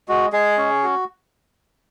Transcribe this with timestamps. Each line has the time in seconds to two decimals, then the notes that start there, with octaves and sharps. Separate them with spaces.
0.09 G#3 F#4
0.33 G#3 G#4
0.58 C#4
0.83 F#4